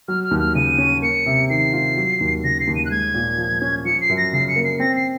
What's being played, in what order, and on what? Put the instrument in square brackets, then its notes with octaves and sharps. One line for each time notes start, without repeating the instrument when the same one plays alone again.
[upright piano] F#3 [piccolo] F6
[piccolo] F6
[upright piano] D#2
[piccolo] F6
[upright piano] C#3 [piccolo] D#7
[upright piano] C#4
[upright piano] A#3 [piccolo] C#7
[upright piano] C3
[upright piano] D#3 [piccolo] C7
[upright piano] F4
F#3
D#2
[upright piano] C#3 [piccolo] A#6
[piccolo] C7
[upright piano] D#2
[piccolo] D#7
F#6
[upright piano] G#3 [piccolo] G#6
[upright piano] A#2
F3
C#4
[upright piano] F3 [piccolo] C#7
[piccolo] C7
[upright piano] F#2
[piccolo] A#6
[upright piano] C#3 [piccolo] C7
[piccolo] C#7
[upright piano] A#3
[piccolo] C7
[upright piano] C4 [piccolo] A#6
[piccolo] C7